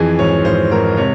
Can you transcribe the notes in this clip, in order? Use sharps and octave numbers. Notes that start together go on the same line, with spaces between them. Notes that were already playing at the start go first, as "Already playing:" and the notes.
Already playing: F2 E3 G#4
G#1 C#5
G#1 C5
G#2 A#4
C3 C#5